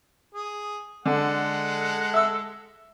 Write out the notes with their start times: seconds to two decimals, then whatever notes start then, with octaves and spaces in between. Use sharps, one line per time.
0.34 G#4
1.06 D3 G#3 A4 F#5
2.14 E5 E6